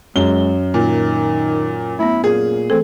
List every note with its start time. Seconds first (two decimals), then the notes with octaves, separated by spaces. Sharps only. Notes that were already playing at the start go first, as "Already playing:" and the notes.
0.16 F#2 G#3 G7
0.74 A#2 D#3
1.99 A3 B3 E4
2.24 A#2 G#4
2.70 E3 A3 C4 A4